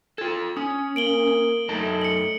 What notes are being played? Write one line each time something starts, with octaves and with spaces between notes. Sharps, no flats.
F4 A4 G#6
C#4 D#6
A#3 D7 F#7 G7
F#2 A3 D#4 A5
C#7 F#7